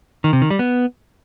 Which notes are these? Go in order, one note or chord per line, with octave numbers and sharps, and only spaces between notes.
D#3
C3
D#3
G3
B3